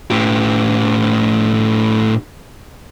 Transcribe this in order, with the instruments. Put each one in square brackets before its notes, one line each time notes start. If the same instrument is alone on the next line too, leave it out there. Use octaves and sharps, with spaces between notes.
[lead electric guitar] A2 G4